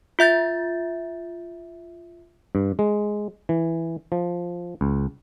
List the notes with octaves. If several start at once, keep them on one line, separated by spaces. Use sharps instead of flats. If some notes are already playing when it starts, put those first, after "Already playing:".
F4 E5 G6 A6
G2
G#3
E3
F3
C#2